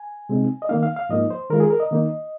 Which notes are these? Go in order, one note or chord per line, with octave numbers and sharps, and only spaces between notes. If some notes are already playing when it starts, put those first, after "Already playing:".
Already playing: G#5
C3 G#3 C4 D#4
D#5
D#3 A#3 D#4 F5
F5
F5
G#2 F3 A#3 D#4 D#5
C5
D#3 G#3 F4 A#4
G#4
A#4
D#5
D#3 A#3 D#4